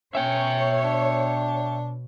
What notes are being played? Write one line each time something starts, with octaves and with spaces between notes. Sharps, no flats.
B2 C#4 C#5 E5 G5
D4